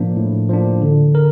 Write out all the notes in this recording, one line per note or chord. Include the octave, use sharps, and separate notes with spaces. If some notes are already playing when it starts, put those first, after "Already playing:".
Already playing: A2 F3 A#3 D4
A2
F3 A#3 D4
D3
A#4